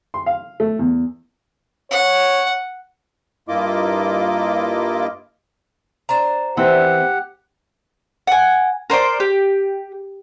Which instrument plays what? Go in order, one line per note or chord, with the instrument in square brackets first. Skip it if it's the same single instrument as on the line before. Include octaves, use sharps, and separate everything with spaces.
[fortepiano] C6
F5
A3
E2
[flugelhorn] C#5 [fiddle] F#5
[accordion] G2 A#3 E4 F4 D#5 D6
[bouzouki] D4 C5 A#5
[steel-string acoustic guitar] E3 C4 [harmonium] G4 F#5
[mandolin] F#5 G#5
A#4 C5 D5 C6
G4